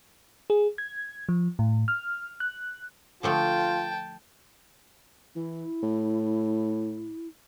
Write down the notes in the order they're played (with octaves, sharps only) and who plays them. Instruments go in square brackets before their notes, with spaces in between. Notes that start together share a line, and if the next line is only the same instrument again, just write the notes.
[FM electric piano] G#4
G#6
F3
A2
F6
F#6
[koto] D3 F3 A3 [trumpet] F4 [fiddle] G5 A5
[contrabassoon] E3 [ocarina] E4
[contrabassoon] A2